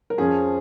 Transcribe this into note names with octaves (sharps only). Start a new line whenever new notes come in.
A#4
F2 F3 C#4 G#4